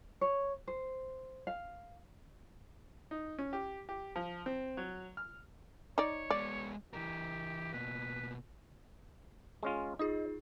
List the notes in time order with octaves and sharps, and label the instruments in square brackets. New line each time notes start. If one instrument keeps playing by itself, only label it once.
[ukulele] C#5
C5
F5
[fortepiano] D#4
C#4
G4
G4
F3
C4
F#3
F6
[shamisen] D#4 D5 [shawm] C#5
[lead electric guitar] G#3 B3 [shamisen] D5
[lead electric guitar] E3 A#4 [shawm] G4
[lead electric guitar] B2 A#3 [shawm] B4
[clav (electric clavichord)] G#3 C#4 F4
[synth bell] D#4 F4 G#4 [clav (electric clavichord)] D#5